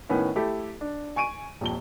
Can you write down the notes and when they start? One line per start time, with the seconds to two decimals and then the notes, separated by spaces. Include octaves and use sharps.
0.09 A2 D#3 B3 C#4
0.36 A3 E4 G4 A4
0.81 D4
1.16 G#5 C#6 D7 D#7
1.61 D#1 F2 G7